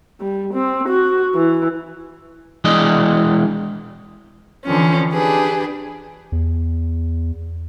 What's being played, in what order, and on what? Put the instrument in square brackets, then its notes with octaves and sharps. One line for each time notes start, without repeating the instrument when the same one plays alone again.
[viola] G3
C4
F#4
E3
[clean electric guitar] E3 G#3 D4 D5 D#5
[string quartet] D3 E3 F3 C4 C#4
D4 G4 G#4 B4
[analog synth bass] E2